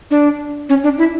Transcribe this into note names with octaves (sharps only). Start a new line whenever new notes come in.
D4
C#4
D4
E4